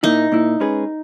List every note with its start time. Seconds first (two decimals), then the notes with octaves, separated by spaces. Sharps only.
0.03 A#2 A#3 D#4 E4
0.32 A#2 A#3 E4
0.60 G#3 C#4 G#4 B4